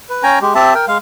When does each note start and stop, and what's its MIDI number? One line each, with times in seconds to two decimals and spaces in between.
0.09 0.23 71
0.23 0.39 61
0.23 0.39 79
0.23 0.39 80
0.23 0.39 82
0.41 0.54 56
0.41 0.54 67
0.55 0.74 60
0.55 0.74 67
0.55 0.74 76
0.55 0.74 81
0.74 0.86 70
0.74 0.86 79
0.88 0.98 56
0.88 0.98 77